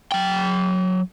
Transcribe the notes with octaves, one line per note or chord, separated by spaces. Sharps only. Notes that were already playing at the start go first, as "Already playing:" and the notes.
F#3 G5